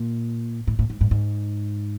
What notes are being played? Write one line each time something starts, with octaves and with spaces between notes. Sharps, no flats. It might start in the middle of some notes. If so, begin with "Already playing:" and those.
Already playing: A#2
A2
A2
G#2
G#2
G#2